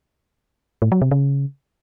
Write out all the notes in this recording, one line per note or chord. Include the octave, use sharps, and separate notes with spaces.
A2
F#3
C3
C#3